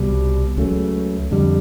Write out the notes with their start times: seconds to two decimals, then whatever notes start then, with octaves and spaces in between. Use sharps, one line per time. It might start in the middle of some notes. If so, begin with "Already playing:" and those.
Already playing: C2 B2 G3
0.57 C#2 C#3 F#3 A3
1.31 F2 D3 G3